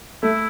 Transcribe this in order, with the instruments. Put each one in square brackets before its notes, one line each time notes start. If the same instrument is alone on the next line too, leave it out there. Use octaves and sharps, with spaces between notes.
[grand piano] A3 [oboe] E4